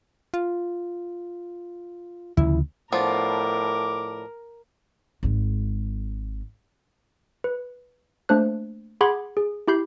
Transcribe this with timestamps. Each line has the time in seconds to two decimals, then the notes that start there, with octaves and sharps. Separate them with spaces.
0.34 F4
2.37 D2 C#3 F3 E4
2.92 A2 F3 B3 D4 A#4 D6
5.23 G#1 G#3
7.44 B4
8.29 A3 A#3 D4 C5 F#6
9.01 G#4 F#5 B5 C6 D6 G#6
9.37 G#4
9.68 E4 G4 B5 G6 C7